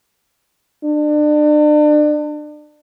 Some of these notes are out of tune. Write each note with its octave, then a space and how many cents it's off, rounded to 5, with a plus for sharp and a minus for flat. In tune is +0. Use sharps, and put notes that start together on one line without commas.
D4 +35